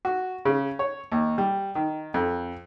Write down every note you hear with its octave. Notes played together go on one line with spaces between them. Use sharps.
F#4
C#3
C#5
D#2
G3
D#3
F2